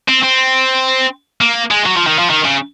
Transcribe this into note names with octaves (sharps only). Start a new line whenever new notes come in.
C4
C4
A#3
G#3
F#3
F3
D#3
F3
D#3
C#3